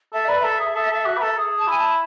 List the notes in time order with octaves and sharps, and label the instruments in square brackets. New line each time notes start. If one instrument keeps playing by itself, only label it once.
[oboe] A4 [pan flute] E5
[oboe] B4 [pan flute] D5
[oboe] A4 [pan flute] E5
[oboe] G#4
A4
A4
F#4
B4
A4
G#4
[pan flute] A5
[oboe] E4 [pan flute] G#5
[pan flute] A5